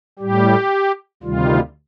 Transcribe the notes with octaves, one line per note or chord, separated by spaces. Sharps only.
A2 G3 G4
D2 C3 D#3 G3 F4